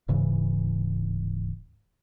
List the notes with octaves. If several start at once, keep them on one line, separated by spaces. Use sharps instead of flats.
D1 G#2 C#3 E3